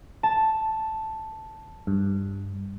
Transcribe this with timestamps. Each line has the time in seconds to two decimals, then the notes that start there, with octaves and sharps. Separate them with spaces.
0.23 A5
1.87 G2